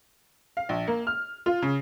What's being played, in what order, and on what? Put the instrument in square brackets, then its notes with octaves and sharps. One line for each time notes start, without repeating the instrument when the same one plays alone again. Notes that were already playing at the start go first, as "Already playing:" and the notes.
[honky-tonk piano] F5
A#1
A#3
F6
F4
C#3